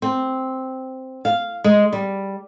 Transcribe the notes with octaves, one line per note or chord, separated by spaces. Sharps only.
C4
F5
G#3
G3